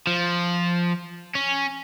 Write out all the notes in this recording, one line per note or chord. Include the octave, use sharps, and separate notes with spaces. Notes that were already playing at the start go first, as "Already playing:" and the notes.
F3
C#4